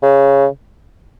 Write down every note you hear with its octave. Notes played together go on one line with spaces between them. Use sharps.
C#3